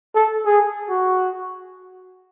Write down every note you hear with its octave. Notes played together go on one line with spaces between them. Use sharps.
A4
G#4
F#4